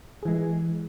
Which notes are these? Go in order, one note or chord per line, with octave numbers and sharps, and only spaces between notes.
E3 G#3 G#4